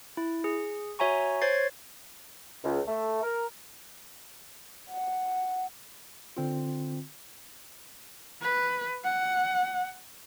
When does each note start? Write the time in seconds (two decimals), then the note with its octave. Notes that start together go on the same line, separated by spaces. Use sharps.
0.17 E4
0.44 G#4
0.99 F#4 C#5 E5 G#5 A#5 C#6
1.41 C5 C#5 G#6 A6 C7
2.64 C#2
2.88 A3
3.22 A#4
4.90 F#5
6.37 D3 C4 F4
8.42 B4
9.04 F#5